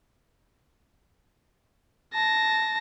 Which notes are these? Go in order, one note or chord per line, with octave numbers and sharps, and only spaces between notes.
A5 A#6